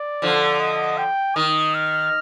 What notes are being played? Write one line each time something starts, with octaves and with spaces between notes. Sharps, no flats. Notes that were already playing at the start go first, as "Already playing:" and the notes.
Already playing: D5
D3 F3
D#5
G5
D#3 D#6
F6